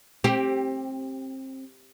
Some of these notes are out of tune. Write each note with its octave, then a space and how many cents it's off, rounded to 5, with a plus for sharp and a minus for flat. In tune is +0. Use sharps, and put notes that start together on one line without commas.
C4 +25 G4 +0